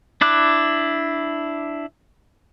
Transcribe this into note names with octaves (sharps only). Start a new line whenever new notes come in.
D4 E4 D6 F#6